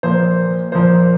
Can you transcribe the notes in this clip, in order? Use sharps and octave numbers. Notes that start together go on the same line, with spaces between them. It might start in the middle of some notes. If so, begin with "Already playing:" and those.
A#2 F3 A#3 C5
A#2 F3 A#3 C5